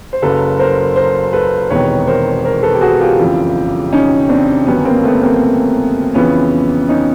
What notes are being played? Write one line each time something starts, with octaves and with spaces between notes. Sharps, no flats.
C5
F#1 F#2 C#3 A4 B4
A#4 C5
A#4 C5
A4 B4
E1 E2 C3 D#3 B4 C#5
A#4 C5
A#4 C5
A4 B4
G4
F#4 G#4
F4 G4
F#1 F2 C#3 E3
C#4 D#4
C4 D4
G1 F#2 D#3 F#3 B3 C#4
A#3 C4
A3 B3
A#3 C4
F2 C#3 E3 B3 C#4
C#4 D#4